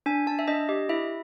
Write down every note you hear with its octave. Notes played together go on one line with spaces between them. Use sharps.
D4 G#5
D4 A5
E5
D4 D#5
G4 D#5
E4 E5